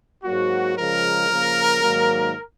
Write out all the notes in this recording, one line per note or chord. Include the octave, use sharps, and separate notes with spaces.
G#2 F#3 A#3 F#4
C#3 F3 G#3 A#4
C#3 F3 A#3
G#2 D#3 F#3 A#3